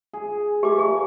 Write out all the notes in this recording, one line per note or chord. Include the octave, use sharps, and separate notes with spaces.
G#4
A3 G4 B4 D6
A#3 G#4